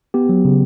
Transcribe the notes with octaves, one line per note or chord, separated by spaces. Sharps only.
B3 G4
F#3
C#3